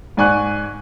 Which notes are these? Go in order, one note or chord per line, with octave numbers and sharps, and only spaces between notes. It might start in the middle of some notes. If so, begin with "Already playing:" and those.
G#2 D5 G#5 C#6 F#6